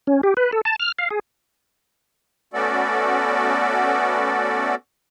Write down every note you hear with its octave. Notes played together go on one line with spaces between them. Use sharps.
C#4
G4
B4
A4
A5
F6
F5
G#4
A3 B3 C#4 F#4 A4 D5